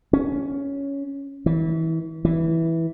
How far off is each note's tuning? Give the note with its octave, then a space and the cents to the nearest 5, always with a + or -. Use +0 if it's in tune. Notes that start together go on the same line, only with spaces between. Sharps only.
C#4 +10
E3 -30
E3 -5